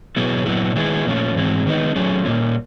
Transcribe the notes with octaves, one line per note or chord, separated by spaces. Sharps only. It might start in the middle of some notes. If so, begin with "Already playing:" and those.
B2 F#3 B3 E4 G#4
A#2 F#3 B3 E4
D#3 G#3 B3 E4 G#4
A#2 F3 A3 C#4 F4
G#2 E3 G#3 C4
D#3 G#3 B3 D#4
F#3 A3 C#4 F4 G#4
A#2 G3 A#3 C#4